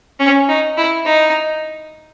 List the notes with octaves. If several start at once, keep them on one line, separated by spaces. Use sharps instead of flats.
C#4
D#4
E4
D#4